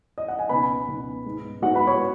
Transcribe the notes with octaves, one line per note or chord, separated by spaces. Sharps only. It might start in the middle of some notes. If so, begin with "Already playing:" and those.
D#5
F#5
G#5
C#2 B2 B3 D#4 B4 B5
C#2 B2 B3 D#4
G#2 G#3 B3
G#2 G#3 B3 F#4 F#5
B4 B5
C#5 C#6